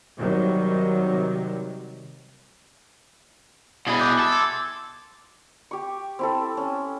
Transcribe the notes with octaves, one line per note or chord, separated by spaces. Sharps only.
C3 D#3 F#3 G3
B2 E4 G#4 E5 B5
D6 F#6 G6
A4 D6
C6 D6 G#6
G4 C#6
C4 E4 A4
C#4